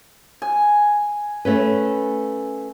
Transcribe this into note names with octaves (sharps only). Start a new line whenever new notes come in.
G#5
A3 C#4 B4